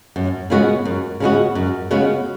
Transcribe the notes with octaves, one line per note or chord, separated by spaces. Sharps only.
F#2
C#3 G#3 B3 F#4
F#2
C#3 G#3 B3 F#4
F#2
C#3 G#3 B3 F#4